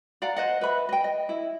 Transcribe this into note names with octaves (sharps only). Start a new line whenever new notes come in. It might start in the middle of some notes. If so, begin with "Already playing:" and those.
D5 F5 F#5 A#5
C5 D#5 F#5
B4 E5 B5
D#5 G5
D#5
E4